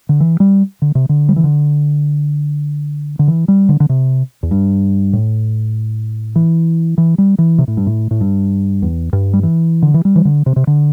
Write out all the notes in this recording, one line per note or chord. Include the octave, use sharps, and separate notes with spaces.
D3
E3
G3
D3
C3
D3
G3
E3
D3
D3
E3
G3
D3
D3
C3
E2
G2
A2
E3
E3
G3
E3
C3
A2
G2
A2
A2
G2
E2
G2
G3
E3
D3
E3
G3
E3
D3
C3
C3
D3